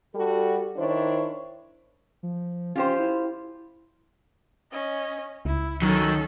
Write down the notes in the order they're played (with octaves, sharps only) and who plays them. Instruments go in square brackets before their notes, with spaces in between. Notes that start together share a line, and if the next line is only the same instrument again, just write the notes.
[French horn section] G3 F#4 A4
D#3 D4 E4 C5 C#5
[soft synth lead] F3
[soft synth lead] C#4 [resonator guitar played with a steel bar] F4 G4 C5
[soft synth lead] E4
[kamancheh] C#4 D#5
[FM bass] C#2 [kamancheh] E4
[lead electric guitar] D#3 [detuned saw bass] F#3 [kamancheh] C#4 A4